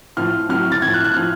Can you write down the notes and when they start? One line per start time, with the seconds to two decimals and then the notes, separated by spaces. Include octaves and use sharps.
0.17 A2 F3 F6
0.49 A2 F#3 F6
0.72 A6
0.82 A2 F3 G#6
0.94 F#6
1.04 F#6
1.14 A2 F3 F6